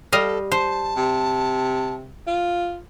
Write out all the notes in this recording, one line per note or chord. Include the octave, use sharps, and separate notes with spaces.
G3 A4 D#5 F5
C5 A5
C3
F4